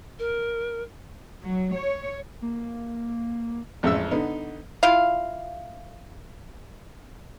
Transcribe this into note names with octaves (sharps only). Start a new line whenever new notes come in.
A#4
F#3
C#5
A#3
A1 F2 C#3 G#3 E5 E6
D3 B3 D#4
E4 F4 F5